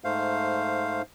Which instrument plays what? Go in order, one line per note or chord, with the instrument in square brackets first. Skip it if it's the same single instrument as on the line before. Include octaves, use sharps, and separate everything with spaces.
[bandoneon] G#2 A3 C5 F5